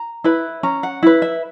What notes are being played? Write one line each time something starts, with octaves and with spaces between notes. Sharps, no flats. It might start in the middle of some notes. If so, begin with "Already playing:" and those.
Already playing: A#5
E4 B4 B5
C#4 A#5
F#5
E4 B4
E5